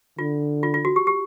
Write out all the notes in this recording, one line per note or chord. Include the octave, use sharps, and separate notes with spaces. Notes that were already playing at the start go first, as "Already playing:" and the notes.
D3 F4
F4
F4
F#4
G4
G4